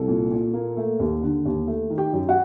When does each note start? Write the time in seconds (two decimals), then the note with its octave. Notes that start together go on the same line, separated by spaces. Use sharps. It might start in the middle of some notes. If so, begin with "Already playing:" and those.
Already playing: C2 A4
0.08 A#2
0.31 A#2
0.54 A#3
0.77 A3
1.00 D#2
1.23 D3
1.45 D#2
1.67 A3
1.90 D#3
1.98 G4 G5
2.13 F#2
2.28 F#4 F#5